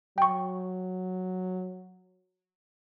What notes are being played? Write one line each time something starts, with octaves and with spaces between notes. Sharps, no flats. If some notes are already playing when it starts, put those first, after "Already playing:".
F#3 G5 C#6